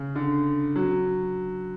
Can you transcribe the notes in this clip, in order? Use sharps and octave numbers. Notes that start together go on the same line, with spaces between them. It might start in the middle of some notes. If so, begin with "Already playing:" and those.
Already playing: C#3
D3
F#3